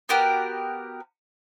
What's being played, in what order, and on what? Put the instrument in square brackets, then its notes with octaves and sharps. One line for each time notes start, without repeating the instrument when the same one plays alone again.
[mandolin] B3 F#4 G4 A#4